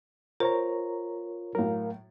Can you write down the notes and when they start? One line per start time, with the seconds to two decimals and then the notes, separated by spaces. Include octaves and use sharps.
0.40 F4 A#4 C5 C#5 A#5
1.55 A2 F#3 A#4 F5